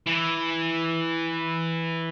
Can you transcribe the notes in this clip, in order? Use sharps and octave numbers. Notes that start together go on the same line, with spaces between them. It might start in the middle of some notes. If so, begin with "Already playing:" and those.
E3